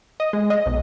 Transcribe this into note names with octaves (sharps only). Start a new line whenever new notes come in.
D#5
G#3
D#5
B1